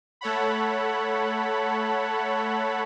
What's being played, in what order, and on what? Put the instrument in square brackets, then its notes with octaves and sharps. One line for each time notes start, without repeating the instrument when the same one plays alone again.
[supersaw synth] A3 A4 C#5 F#5 B5